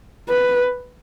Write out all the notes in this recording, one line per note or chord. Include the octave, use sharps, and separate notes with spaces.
B4